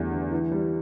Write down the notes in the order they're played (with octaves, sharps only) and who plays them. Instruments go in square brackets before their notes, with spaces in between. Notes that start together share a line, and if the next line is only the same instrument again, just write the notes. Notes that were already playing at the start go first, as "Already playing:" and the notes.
Already playing: [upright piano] E2 D3 G3 A3
D3
E3
G3